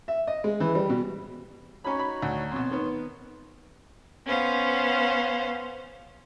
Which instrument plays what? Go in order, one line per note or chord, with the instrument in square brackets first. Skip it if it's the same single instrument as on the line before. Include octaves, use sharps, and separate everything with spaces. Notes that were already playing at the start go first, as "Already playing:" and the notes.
[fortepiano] E5
D#5
G#3
E3
G3
B2
[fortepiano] C#4 B5 [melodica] D#4 F#4 C#5
[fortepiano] B5
D2
[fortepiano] F2 B2 [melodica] C#5 C6
[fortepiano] D#3 B3
[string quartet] B3 C#4 C5 F5